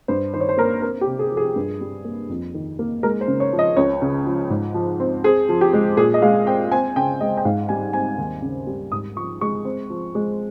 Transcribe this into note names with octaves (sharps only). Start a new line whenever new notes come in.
G2 C5
D#3 C5
C#5
C5
A#3 A#4
C4 A#4
G4
C3
G#4
F3
G#4
G2
G3
A#3
F2
D#3
A#3
G#3 A#4
C5
C#3
C#5
F3
D#5
C#2 C#5
C#3
F3
G#2
F3
C4
C4 G#4
F3
G4
G#3
A#2 G#4
D#5
G#3 F5
C4 G5
C4 G#5
C#3 G5
G#3 D#5
G5
G#2 F5
G3 G#5
C4 G#5
D#2
C#3
G3
G#2 D#6
F3 C#6
G#3 C#6
C4
F3
G#3